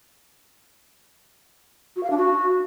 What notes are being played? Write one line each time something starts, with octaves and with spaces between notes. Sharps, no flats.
F#4
F5
D4
F#4